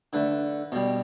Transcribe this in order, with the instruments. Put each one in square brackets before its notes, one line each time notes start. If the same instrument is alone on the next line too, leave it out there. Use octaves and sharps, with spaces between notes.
[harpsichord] D3 A3 B4
B2 G3